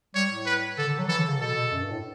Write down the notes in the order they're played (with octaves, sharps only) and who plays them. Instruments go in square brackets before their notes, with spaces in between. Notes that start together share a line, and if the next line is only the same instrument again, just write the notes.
[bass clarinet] G3 [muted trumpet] C#5
[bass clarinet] A2
[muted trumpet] B4
[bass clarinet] D3 [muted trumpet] A4
[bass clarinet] D3
F#3
[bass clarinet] E3 [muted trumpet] A4
[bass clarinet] D3
C#3
[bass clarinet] B2 [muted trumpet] A4
[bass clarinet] B2
F#2
G2
A2